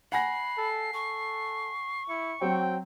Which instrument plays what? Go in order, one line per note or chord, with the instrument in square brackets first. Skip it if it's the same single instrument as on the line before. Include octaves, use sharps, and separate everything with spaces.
[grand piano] F#5 G#5 A#6 [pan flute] B5 [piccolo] C7
[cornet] A4
[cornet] A4 [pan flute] C#6
[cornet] E4 [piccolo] C#7
[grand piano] F#3 C4 [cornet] G5